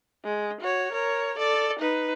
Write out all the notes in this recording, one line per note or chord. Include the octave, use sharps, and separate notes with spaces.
G#3
F#4 C#5
A#4 C#5
A4 D5
D#4 B4